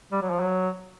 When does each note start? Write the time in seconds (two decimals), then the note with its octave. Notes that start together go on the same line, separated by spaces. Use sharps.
0.12 G3
0.22 F#3
0.30 F3
0.40 F#3